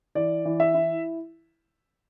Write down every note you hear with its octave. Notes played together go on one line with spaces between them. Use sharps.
E3 D5
E3
E5
E4